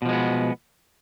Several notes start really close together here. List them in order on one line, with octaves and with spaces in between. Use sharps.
B2 F3 G#3 B3